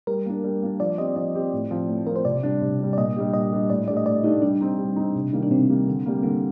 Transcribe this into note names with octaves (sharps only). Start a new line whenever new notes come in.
G3 A#4
A#3 D4
G3
A#3 D4
F3 D5
C4 G4 D#5
F3 D5
C4 G4
A2
F3 C4
A2
F3 C4 A#4
C5
C3 D5
G3 D4
C3
G3 D4
D5
A#2 D#5
G3 D4 G4
A#2 D#5
G3 D4 G4
A2 D5
A3 D4 G4 D5
D#5
A2 D5
A3 D4 D#4 G4
G3 D4
C4 D#4
G3
C4 D#4
C3
D#3 G3 A#3
D4
C3 C4
D#3 G3 A#3
D3
G3 A#3
D3 A#3